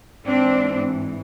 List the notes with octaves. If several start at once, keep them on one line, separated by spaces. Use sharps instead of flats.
G#2 E3 C4 D4